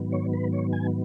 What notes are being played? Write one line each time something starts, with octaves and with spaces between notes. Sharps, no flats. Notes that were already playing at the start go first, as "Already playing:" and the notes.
Already playing: G#2 D#3 F#3 B3
C#5
B4
C#5
G#5